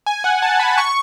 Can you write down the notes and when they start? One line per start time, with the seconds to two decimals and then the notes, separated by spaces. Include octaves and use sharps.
0.06 G#5
0.24 F#5
0.42 A5
0.59 B5
0.78 C#6